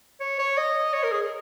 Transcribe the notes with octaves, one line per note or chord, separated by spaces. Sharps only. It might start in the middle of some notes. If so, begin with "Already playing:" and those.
C#5
C#5
D#5
C#5
A#4
G#4